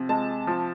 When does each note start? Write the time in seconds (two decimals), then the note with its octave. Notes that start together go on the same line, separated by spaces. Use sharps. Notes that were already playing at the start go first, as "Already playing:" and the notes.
Already playing: C3 F3
0.09 G#3 A5
0.47 F3